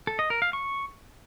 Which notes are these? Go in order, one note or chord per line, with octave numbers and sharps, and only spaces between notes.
A4
D#5
A#4
F5
C#6